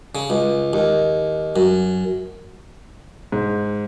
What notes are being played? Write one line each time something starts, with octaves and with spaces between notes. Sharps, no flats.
C#3
C#2
D#2
F#2
G#2